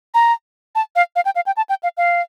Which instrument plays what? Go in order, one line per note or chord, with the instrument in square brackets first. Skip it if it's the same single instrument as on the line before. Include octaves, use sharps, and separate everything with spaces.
[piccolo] A#5
A5
F5
F5
G5
F5
G5
A5
G5
F5
F5